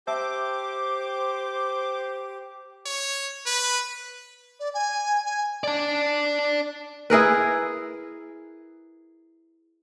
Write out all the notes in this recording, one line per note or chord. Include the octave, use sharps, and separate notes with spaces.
G4 C5 E5 A5 D6 E6
C#5
B4
D5
G#5
G#5
D5 A5
E4 G#4 A#4 B4